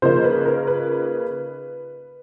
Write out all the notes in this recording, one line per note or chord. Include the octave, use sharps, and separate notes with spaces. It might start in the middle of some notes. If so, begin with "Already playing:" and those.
C#3 F3 A#3 D#4 C5
B4
A#4
B4